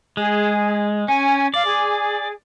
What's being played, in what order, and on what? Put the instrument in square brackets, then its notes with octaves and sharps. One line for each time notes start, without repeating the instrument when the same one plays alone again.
[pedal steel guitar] G#3 [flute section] G#4
[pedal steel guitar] C#4 [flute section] G#5
[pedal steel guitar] D5 [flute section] F5
[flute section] G#4